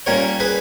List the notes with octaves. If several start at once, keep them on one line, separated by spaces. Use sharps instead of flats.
A#2 G3 C#4 A#4 C#5
G#4 B4